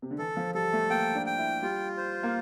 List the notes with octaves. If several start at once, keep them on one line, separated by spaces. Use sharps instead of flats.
C3
D3
E3 A4
F3
G3 A4
A3
A#3 G5
D4
G5
E4
G3 F4
C5
A#3